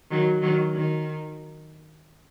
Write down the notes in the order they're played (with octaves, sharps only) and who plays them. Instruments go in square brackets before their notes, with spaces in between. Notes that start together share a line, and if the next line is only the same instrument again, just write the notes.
[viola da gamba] D#3 F#3
D#3 F#3
D#3